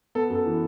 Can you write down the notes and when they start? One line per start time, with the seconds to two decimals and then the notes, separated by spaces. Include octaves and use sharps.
0.15 B3 A4
0.30 F#2
0.35 A4
0.46 E3